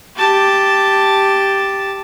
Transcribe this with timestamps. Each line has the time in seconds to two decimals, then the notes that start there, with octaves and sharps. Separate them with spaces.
0.16 G4 A5